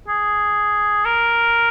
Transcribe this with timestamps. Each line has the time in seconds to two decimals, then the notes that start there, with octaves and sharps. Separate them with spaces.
0.08 G#4
1.05 A#4